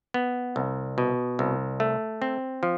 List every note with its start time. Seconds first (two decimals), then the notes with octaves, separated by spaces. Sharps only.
0.14 B3
0.56 C2
0.98 B2
1.39 C2
1.80 A3
2.22 C4
2.63 F3